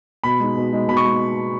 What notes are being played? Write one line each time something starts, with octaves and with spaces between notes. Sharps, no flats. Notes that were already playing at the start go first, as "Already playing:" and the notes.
B2 B5
G#3 D#4
B2
G#3 D#4
B2 B5
C#6
G#3